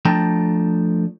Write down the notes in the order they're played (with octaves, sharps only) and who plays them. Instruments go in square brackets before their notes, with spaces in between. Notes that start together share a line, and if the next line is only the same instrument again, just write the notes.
[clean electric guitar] F3 A3 D4 G5 A5 A#5